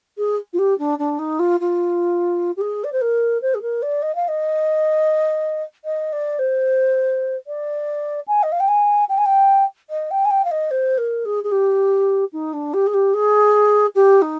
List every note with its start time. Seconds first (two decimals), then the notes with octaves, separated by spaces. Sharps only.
0.18 G#4
0.53 F4
0.59 G4
0.79 D4
0.99 D4
1.19 D#4
1.39 F4
1.60 F4
2.57 G4
2.61 G#4
2.84 D5
2.92 C5
3.01 A#4
3.42 C5
3.54 G#4
3.62 A#4
3.82 D5
4.02 D#5
4.15 F5
4.28 D#5
5.85 D#5
6.13 D5
6.39 C5
7.47 D5
8.28 G#5
8.43 D#5
8.52 F5
8.60 G5
8.68 G#5
9.09 G5
9.18 G#5
9.26 G5
9.90 D#5
10.11 G5
10.25 G#5
10.31 G5
10.45 F5
10.51 D#5
10.71 C5
10.98 A#4
11.25 G#4
11.44 G#4
11.52 G4
12.33 D#4
12.53 D4
12.74 G4
12.87 G#4
12.94 G4
13.14 G#4
13.95 G4
14.22 D#4